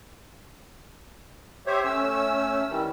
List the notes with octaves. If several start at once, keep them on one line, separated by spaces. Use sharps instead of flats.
G4 C5 C#5 E5
A3 C#4 E6
D#3 E3 G3